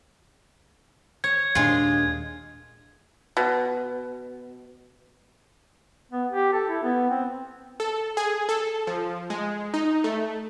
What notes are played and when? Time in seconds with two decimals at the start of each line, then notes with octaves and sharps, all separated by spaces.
1.24 C#5 G#6
1.55 D#2 A#2 G#3 D4 F4
3.37 B2
6.11 B3
6.31 G4
6.53 A4
6.69 E4
6.83 B3
7.10 C4
7.80 A4
8.17 G#4
8.49 A4
8.87 F3
9.30 G#3
9.74 D#4
10.04 A3